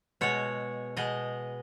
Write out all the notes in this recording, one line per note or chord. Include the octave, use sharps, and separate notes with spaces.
B2 G#3 C#5
B2 G#3 D#5